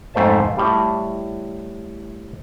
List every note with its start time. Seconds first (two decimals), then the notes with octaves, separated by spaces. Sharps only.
0.14 F2 G#2 A3 C5 E5 A5
0.57 A2 G3